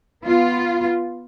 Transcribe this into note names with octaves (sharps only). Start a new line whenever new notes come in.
B3 F4